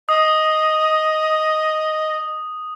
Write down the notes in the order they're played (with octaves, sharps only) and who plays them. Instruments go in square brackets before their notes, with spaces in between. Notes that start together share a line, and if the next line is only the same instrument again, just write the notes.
[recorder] D#5 [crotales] D#6